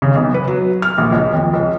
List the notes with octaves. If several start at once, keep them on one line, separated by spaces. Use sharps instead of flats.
C#3
B1
B4
F#3
F6
A#1
C#2
F2
C#2